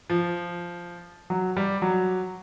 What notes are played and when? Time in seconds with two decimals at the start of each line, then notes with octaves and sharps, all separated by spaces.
0.10 F3
1.30 F#3
1.57 G3
1.82 F#3